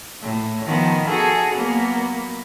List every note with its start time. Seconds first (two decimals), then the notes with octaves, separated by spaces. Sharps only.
0.22 A2
0.65 D#3 F3 B3
1.07 F#4 G#4 A4
1.54 F#3 A#3 B3